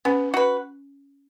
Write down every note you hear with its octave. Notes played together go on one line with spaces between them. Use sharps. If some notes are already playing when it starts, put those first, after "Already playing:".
B3 C#4
F#4 B4